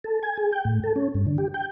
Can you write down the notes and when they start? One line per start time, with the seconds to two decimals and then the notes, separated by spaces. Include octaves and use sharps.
0.04 A4
0.23 G#5
0.38 G#4
0.52 G5
0.65 A2
0.84 A4
0.96 C#4
1.14 G2
1.27 D3
1.38 G4
1.54 G5